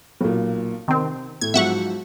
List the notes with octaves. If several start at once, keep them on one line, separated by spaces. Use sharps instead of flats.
B1 A#2
C3 D#3 C4
A2 G#6
G#2 F3 F#3 E5 F#5 C#6